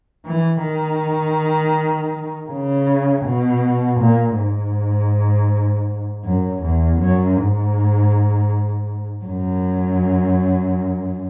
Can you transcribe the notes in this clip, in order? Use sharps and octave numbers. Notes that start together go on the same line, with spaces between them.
E3
D#3
C#3
B2
A#2
G#2
F#2
E2
F#2
G#2
F#2